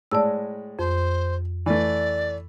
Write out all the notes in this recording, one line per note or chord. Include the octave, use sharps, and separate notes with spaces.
A2 G#3 D5 A5 E6
F2 C5
E3 A3 D5